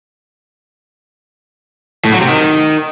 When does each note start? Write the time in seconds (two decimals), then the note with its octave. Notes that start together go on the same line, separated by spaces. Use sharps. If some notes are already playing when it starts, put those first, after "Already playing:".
2.05 A2
2.12 F#3
2.20 C3
2.28 D#3